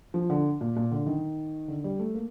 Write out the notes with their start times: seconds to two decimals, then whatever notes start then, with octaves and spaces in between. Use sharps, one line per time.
0.14 F3
0.30 D3
0.61 A#2
0.76 A#2
0.91 D3
1.06 D#3
1.68 D3
1.84 G3
1.99 A3
2.15 A#3